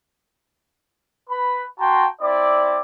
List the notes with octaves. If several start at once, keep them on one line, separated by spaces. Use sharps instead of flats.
B4 B5
F#4 G5 A5 A#5 C6
C4 E4 D5